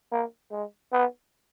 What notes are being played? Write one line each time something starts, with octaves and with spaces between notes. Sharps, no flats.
A#3
G#3
B3